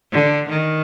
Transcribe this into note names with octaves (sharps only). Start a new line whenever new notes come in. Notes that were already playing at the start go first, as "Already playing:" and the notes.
D3
D#3